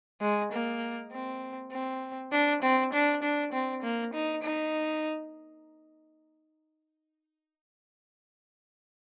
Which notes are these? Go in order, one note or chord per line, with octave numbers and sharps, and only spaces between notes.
G#3
A#3
C4
C4
D4
C4
D4
D4
C4
A#3
D#4
D#4